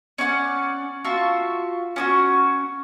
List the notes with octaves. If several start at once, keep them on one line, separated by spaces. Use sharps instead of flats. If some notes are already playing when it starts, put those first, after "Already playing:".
C#4 D5 F#5
F4 F#4 E5 A5
C#4 D4 F#4